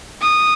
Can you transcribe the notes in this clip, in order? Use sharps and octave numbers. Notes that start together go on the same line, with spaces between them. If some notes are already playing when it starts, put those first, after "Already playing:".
D#6